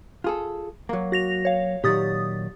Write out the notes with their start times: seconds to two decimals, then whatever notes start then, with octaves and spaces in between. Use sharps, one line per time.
0.24 F4 G#4 A4
0.89 F#3 A#3
1.12 F#4 A#6 F7
1.45 C#5 F5
1.84 A#2 D#3 F#3 G4 D#6 A6